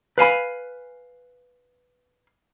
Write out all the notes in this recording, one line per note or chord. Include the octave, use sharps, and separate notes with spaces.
B4 F5 G#5 B5